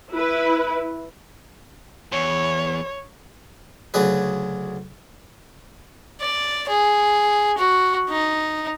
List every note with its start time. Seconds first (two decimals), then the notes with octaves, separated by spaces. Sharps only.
0.11 E4 B4
2.12 E2 C#5
3.94 D2 C#3 F#3 G#4 B4
6.21 D5
6.69 G#4
7.58 F#4
8.09 D#4